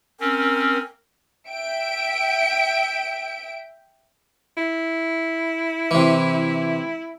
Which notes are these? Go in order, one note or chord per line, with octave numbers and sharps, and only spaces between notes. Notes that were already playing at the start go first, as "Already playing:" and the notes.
C4 C#4 A#4
E5 G5 D7
E4
C3 E3